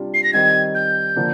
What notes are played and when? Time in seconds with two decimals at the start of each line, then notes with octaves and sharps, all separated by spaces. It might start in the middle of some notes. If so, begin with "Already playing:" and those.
Already playing: C3 G3 D4 F4
0.14 C7
0.24 A#6
0.33 D#3 G3 C4 D#4 G#6
0.75 G6
1.16 D3 F3 A#3 D4